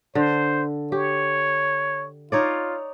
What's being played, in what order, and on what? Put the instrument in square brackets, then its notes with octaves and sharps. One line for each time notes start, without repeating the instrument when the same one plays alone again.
[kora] D3 [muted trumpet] C5
[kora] G4 [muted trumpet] C#5
[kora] D#4 C#5 D5 [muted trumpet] F4